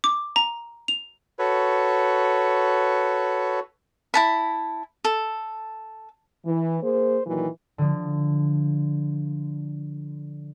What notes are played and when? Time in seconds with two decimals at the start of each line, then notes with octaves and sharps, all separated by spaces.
0.04 D6
0.36 A#5
0.88 F7
1.39 F#4 A4 B4 C#5
4.14 E4 A5 B5
5.05 A4
6.45 E3
6.83 A#3 G#4 C5
7.27 A#2 D#3 E3 F#3
7.78 D3 F3